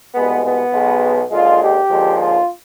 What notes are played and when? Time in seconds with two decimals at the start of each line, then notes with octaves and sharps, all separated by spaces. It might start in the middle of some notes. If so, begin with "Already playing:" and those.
0.14 C2 B2 G#3 B3
0.43 B3
0.73 B1 B2 G#3
1.31 D#2 D3 G#3 F4
1.60 G4
1.90 D#2 D3 F3 G#3
2.19 F4